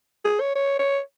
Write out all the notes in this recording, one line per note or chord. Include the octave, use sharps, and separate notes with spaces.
G#4
C#5
C#5
C#5